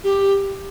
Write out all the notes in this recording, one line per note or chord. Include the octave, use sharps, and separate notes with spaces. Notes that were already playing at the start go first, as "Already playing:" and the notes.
G4